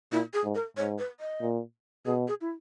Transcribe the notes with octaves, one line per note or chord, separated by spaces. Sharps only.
A#2 E4
G#4
G#2
A#4
G#2 C#5
B4
D#5
A#2
B2 G#4
G#4
E4